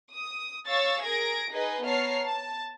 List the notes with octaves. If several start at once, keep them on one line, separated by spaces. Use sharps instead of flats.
D#6
C#5 F5 C#6 E6 A6
G#4 A#4 G#6 A#6 D7
D#4 G#4 B4 D#5
B3 C#5 A5 A#5 F6 C7
A5